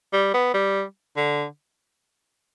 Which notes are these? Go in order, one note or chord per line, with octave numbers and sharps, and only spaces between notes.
G3
B3
G3
D3